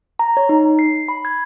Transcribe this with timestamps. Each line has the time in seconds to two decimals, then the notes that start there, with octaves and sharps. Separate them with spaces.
0.19 A#5
0.37 C#5
0.49 D#4
0.79 C7
1.08 B5
1.25 G#6